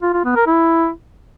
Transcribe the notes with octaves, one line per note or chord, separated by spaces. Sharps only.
F4
F4
B3
A#4
E4